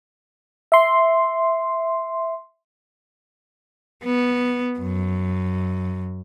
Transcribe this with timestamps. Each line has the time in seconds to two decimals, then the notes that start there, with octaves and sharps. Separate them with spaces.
0.72 E5 C6
4.04 B3
4.79 F#2